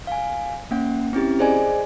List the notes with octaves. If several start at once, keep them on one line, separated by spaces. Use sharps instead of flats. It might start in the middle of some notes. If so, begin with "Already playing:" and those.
F5 G#5
A#3 C#4 F#5
C4 C#4 E4 G4
G#4 C5 D5 D#5 G#5